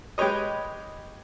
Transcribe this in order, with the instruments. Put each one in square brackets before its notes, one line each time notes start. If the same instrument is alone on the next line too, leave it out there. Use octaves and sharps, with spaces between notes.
[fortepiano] G#3 G4 B4 C#5 D#5